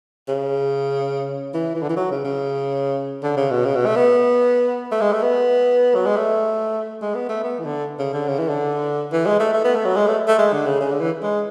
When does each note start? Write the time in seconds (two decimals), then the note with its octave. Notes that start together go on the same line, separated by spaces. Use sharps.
0.28 C#3
1.54 E3
1.75 E3
1.82 D3
1.89 E3
1.96 F#3
2.11 C#3
2.24 C#3
3.23 D3
3.37 C#3
3.51 B2
3.65 C#3
3.76 B2
3.86 A3
3.96 B3
4.91 A3
5.01 G#3
5.12 A3
5.22 B3
5.95 F#3
6.06 G#3
6.16 A3
7.02 G#3
7.15 B3
7.29 A3
7.44 B3
7.59 E3
7.65 D3
7.99 C#3
8.13 D3
8.27 C#3
8.39 E3
8.49 D3
9.12 E3
9.26 G#3
9.39 A3
9.53 A3
9.64 B3
9.75 A3
9.85 F#3
9.96 G#3
10.07 A3
10.28 A3
10.38 G#3
10.53 D3
10.66 C#3
10.80 C#3
10.91 D3
11.00 E3
11.23 G#3